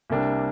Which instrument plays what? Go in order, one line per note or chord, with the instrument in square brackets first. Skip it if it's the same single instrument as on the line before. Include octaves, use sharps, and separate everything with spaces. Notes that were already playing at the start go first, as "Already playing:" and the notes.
[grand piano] C2 C3 G3 A#3 D4